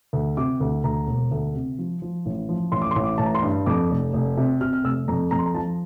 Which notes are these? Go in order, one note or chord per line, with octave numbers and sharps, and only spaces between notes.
D2
C3 D6
D2
D2 A#5
E1
D2
C3
F3
F3
A1
F3
A1 C6
D6
C6
A1
D6
A1 A5
A#5
C6
G2
F2 D6
F1
F1
C3
C3 F6
F6
F1 E6
F2 A#5
F2 A#5
C6
A#5
F3 A5